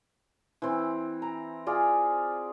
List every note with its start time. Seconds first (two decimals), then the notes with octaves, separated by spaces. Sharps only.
0.62 E3 C4
1.22 A#5
1.66 F4 G#4 D5